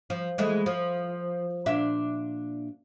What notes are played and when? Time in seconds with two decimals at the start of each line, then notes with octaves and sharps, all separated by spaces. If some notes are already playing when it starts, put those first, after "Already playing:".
0.10 F3
0.38 E3 G#3 A3
0.66 F3
1.66 A#2 D4 E5